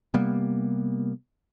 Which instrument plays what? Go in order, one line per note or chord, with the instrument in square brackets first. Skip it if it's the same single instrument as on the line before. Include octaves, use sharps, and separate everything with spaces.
[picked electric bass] C3 G3 A#3 B3